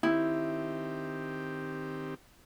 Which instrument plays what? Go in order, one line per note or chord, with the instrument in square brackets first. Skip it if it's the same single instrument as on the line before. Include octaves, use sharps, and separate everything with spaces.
[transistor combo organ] D#3 C4 G4 [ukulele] E4